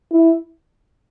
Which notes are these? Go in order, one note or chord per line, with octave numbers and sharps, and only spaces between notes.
E4